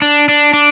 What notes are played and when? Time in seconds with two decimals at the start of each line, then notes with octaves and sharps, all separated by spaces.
0.02 D4
0.29 D4
0.53 D4